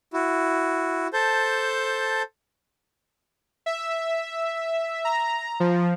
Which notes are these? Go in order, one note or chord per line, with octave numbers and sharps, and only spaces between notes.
E4 F#4
A4 C5 A5 G6
E5
A#5
F3